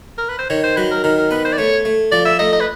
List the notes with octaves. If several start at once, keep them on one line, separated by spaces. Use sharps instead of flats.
A#4
B4
C5
D#3 C#5
C5
F#3 B4
A#4
D#3 A#4
A#4
B3 B4
C5
D5
A3 C#5
A3
F3 D5
E5
A3 D#5
D#5
B4